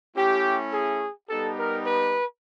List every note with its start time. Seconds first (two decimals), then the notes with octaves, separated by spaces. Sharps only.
0.16 A3 C#4 E4 G4
0.72 G#4
1.28 G3 B3 D#4 G4 A4
1.57 A#4
1.85 B4